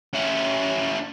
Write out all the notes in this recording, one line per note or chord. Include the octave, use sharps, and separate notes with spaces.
C#4 E4